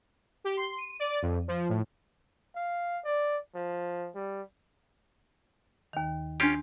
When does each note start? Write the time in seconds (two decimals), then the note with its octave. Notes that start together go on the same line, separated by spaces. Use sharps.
0.44 G4
0.57 C6
0.78 D#7
1.00 D5
1.22 F2
1.48 F3
1.69 A2
2.56 F5
3.05 D5
3.55 F3
4.15 G3
5.93 D#2 D#3
6.40 C#4 D4 F4 G4 G#5 C6 D#6 G6